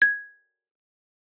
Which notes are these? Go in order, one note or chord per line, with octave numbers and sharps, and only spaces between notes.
G#6